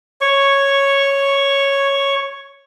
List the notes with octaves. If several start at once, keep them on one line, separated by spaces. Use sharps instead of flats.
C#5 C#6